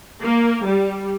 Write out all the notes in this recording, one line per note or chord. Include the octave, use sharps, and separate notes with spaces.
A#3
G3